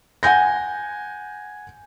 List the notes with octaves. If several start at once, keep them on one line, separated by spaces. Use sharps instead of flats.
F#5 G#5 G6 A#6